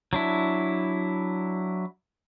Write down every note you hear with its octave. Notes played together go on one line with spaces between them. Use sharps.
F#3 D4 E4